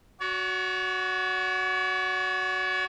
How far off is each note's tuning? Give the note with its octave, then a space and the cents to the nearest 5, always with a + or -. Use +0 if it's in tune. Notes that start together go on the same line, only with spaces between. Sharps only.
F#4 +0 C#5 +45